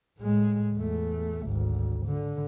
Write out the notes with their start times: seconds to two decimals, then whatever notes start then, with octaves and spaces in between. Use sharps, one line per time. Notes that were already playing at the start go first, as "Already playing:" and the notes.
0.18 A2 G#3
0.74 E2 A3
1.46 G#1 D2
2.07 D3